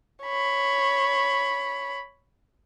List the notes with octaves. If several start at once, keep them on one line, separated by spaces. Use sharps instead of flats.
C#5 B5